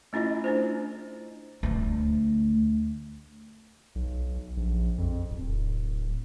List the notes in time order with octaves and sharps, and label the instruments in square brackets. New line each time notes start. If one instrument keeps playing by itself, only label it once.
[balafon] A3 C#4 E4 F4 D#5
D4 E4 C5
[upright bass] D2 A3
[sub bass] B1
A#1
F2
D1